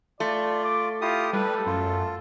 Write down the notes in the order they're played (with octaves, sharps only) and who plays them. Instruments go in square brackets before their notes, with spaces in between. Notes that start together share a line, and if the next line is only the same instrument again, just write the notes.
[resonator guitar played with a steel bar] A3 [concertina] F4 [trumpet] D5
[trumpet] D6
[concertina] E4 G4 D#6 [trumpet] F4
[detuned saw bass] G3 [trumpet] A4 [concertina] B4
[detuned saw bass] F#2 [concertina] F4